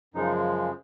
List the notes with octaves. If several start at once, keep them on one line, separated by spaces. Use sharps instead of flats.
F#2 C#3 F3 G#3 D#4